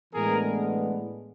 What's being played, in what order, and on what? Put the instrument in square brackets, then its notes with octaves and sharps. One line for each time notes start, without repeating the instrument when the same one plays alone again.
[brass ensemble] A2 E3 G#3 B3 D4 G#4 A#4